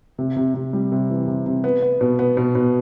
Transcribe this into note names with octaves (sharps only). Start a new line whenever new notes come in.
C3
C3
C3
G3
C3
E3
C3
C3
B3
B3
B2
B3
B2
B2